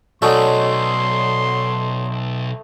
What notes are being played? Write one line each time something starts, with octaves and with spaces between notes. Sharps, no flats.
B1 F#3 A3 C#4 D4 D#5 C6